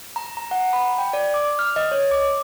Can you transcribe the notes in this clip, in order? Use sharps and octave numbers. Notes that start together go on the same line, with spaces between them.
A#5
A#5
F#5
B5
G5
D5
D6
F6
D#5
C#5
D6